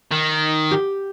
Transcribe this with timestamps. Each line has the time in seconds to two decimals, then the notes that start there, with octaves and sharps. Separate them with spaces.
0.11 D#3
0.71 G4